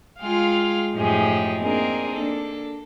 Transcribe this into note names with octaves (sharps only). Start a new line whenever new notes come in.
G#3 F4 G#4 F5 G5 F6
F#2 A2 F3 D#4 G4 G#4
A#3 C4 D4 D#4 G#4 A#4
A#3 D4 A4